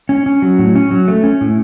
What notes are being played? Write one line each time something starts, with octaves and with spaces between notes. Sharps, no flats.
C#4
C#4
F#3
A2
C#4
F#3
A3
C#4
A2